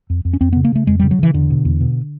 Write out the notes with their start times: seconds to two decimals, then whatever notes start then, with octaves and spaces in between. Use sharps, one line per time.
0.10 F2
0.25 F2
0.33 C#4
0.41 F2 C4
0.53 C#3 B3
0.65 A#3
0.72 C#3 A3
0.87 F2 G#3
1.00 C#3 G3
1.11 F#3
1.19 C#3 E3
1.34 E2 D3
1.50 B2
1.65 E2
1.81 B2